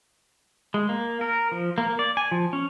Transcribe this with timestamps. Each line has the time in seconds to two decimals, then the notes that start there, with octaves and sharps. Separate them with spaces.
0.74 G#3
0.89 A#3
1.21 A#4
1.52 F3
1.78 A#3
1.99 D5
2.17 G#5
2.31 F3
2.53 C#4